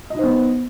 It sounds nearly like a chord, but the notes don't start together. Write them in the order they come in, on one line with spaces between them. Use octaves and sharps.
D#5 D#4 C5 B3